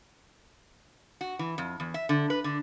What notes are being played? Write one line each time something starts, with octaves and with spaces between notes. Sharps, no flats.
F#4
E3
F2
E2
E5
D3
B4
D3